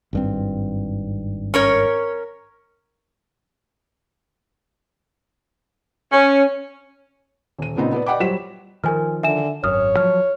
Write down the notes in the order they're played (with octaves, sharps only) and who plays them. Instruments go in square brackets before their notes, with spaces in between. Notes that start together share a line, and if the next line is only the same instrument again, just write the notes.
[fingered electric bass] G#1 G2 C4
[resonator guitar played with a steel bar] C#4 A#4 C#5
[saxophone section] C#4
[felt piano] D#1 D#7
A#2 C#3 B3 C4 D#4
B3 B4 D5
D5 D#5 F#5 G5 B5 D6
F#3 G3 C5 B6 E7
[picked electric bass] D#3 F3 [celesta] A#4 G#5 F6
[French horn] D3 [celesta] E5 G#5 E7
[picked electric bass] G#1 F#2 [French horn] C#5 [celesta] D#6 F6
[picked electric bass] F3 F#3 [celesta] F6